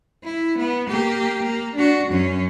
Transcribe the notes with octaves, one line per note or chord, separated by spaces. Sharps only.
E4
B3
A#3 G4
A#3
D4 F#4
F#2 C#4